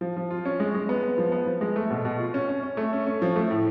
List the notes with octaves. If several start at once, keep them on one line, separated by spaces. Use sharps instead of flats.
F3
F3
F4
C#4
G#3
G#3
B3
B3
F3
B3
F3
G#3
A3
B2
B2
F4
C#4
C#4
C#4
A3
C#4
C#4
F3
A3
A2